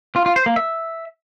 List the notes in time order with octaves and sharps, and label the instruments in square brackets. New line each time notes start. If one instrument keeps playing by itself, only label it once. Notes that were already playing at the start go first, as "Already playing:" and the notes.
[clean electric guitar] F4
F4
C5
A#3
E5